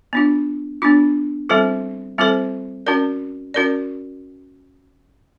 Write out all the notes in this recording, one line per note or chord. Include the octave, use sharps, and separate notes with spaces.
B3 D4 F4
B3 D4 F4
G3 C4 F4 A4 C5
G3 C4 F4 A4 C5
C#4 F#4 A#4 D5
C#4 F#4 A#4 D5